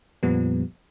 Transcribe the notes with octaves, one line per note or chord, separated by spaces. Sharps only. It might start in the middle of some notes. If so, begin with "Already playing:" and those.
F2 A#2 F3 G3 B3